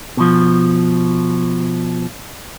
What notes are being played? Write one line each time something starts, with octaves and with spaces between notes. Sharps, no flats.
B2 F3